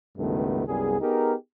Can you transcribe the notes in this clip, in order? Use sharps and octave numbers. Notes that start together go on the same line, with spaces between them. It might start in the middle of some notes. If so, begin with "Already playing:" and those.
C#2 G2 B2 D#3 A3 B3
C2 F#2 G3 B3 G#4
B3 D#4 G4 G#4 A#4